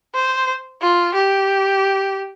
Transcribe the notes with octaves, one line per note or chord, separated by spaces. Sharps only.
C5
F4
G4